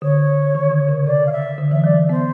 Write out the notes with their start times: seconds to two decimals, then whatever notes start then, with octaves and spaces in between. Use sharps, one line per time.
0.02 D3 C#5
0.55 D#3
0.71 D3
0.89 C#3
1.06 C3 D5
1.26 F5
1.32 E5
1.58 D3
1.71 E3 E5
1.84 F#3 D5
2.09 B3 C5